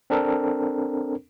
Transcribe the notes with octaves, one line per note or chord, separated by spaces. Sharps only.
C4 D4 A4 A#4